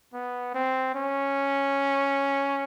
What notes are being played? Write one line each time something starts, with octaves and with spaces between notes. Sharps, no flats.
B3
C4
C#4